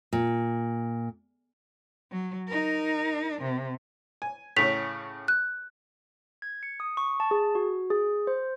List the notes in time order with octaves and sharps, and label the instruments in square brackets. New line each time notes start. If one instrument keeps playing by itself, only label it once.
[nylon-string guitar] A#2
[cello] F#3
D#4 A#4
C3
[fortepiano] G#5
[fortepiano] A2 C#3 C#4 [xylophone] B6 F7
[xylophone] F#6
[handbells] G#6
C#7
D#6
C#6
A5
G#4
F#4
G#4
C5